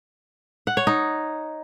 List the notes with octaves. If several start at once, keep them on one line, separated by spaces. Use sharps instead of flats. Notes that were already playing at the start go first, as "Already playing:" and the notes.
F#5
C#5
D#4